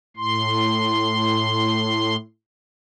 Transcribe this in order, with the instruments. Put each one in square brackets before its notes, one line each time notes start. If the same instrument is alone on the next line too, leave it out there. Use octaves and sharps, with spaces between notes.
[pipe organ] A2 C6